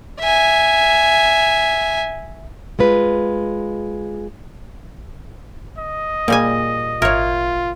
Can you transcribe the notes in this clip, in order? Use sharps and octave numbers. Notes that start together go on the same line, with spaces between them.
E5 G#5
G#3 F4 B4
D#5
A#2 G3 A#3 G#4 G#5
G#1 F4 A#4 C#5 E5 G#6